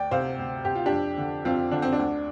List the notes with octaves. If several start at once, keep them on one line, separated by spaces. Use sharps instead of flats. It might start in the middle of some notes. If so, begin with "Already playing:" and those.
Already playing: D2 D5 G5
C3 C5 F5
D2
C3 G4
F4
D4 G4
F2
D3
F2 C4 F4
D3 D4
C4
D4
D2